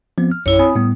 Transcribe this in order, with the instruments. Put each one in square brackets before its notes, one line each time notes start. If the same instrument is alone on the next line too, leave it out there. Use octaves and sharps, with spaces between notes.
[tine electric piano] F3 B3 C4
F6
[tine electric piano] A#1 F#2 [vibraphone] E4 C#5
[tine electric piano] C4 G#5 B5 [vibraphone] D#6
[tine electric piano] A2 G3 B3